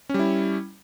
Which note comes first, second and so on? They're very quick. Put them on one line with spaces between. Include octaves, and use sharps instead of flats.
C#4 G3 E4